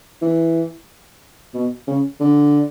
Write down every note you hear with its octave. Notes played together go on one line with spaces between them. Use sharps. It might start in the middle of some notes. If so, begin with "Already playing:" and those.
E3
B2
C#3
D3